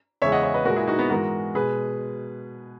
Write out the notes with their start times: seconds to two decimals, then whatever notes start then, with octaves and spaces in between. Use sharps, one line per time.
0.22 E2 C#3 G#3 C#5 E5
0.32 D#5 F#5
0.43 C#5 E5
0.54 B4 D#5
0.65 A#2 G#3 F#4 A#4
0.76 E4 G#4
0.88 D#4 F#4
0.99 B3
1.10 G#2 E3 G#3 F#4 A#4
1.55 B2 G#3 G#4 B4